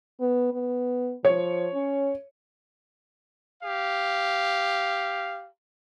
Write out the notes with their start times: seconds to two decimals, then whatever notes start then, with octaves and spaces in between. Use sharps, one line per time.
0.20 B3
0.54 B3
1.25 F3 C#5
1.74 C#4
3.63 G4 F5